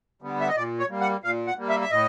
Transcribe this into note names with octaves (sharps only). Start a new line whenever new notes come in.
D3 G3 B3
E5
D#5
A#2 D5
C#5
G3 A#3
F#5
A#2 F5
F#5
G3 A#3
E5
E5
A2 D#5